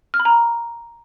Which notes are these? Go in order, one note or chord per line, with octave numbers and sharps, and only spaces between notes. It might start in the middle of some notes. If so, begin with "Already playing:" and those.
F6
B5
A#5